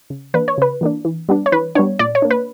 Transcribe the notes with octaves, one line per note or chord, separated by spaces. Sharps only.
C#3
E3 A#3 D4 B4
C#5
C#3 B4
E3 A#3 D4
E3
G3 B3 D4
C#5
E3 B4
G3 B3 D4 C#5
A#2 D5
C#5
A#3 D4
B4